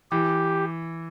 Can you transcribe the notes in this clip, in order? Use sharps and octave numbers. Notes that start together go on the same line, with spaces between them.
E3 G4